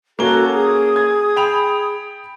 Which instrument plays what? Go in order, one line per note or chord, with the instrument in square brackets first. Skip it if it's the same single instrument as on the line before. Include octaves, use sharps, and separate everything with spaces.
[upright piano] A#3 C#4 G7 [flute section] F#4 A4 A#5
[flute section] G#4 D#6
[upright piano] G#6
G5 B5 F7